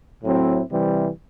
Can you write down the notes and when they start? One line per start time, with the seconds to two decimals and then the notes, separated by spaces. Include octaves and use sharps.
0.23 A2 F#3 C4 E4
0.71 C3 E3 G3 C4